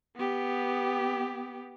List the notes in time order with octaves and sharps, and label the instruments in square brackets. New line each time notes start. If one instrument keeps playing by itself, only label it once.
[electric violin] B3 G4